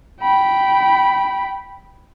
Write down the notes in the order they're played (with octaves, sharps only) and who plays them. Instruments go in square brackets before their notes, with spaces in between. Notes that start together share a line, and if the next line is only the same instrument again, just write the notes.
[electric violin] G5 B5